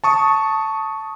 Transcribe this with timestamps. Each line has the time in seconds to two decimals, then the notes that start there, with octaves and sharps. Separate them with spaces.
0.04 A5 C#6 D#6